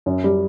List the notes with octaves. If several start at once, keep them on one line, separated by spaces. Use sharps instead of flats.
F#2
G3